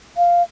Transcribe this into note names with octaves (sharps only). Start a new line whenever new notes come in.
F5